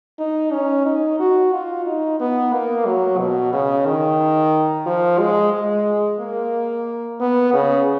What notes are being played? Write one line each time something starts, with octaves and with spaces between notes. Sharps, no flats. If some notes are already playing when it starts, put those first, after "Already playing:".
D#4
C#4
D#4
F#4
F4
D#4
B3
A#3
F#3
B2
C#3
D#3
F3
G#3
G#3
A#3
B3
C#3